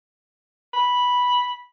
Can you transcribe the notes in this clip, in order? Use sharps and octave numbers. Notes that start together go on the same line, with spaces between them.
B5